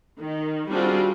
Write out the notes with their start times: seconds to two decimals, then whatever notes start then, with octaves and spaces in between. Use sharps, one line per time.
0.20 D#3
0.69 G3 C4 D4 F4 F#4 G#4